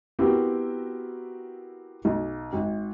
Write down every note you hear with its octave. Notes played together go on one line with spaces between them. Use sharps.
B3 C4 E4 F#4 G4 A#4
B1
G#1